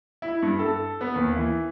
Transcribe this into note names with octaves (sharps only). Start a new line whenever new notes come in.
E4
G2
A4
B3
D#2
E3